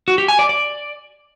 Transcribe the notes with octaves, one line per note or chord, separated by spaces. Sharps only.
F#4
G4
G#5
D5
D5